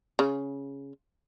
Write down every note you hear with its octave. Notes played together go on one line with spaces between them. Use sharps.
C#3